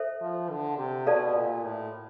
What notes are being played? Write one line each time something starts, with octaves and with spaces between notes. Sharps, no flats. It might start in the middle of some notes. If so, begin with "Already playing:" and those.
Already playing: A4 C5 E5
F3
D3
C3
B2 A4 D5 F5 A5
A#2
A2